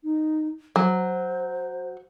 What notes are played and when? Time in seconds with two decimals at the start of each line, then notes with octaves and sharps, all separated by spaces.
0.04 D#4
0.76 F#3 C5